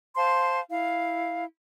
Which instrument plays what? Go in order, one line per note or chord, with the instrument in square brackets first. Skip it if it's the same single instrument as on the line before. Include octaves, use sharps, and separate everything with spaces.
[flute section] C5 F5 A5 C6
E4 F5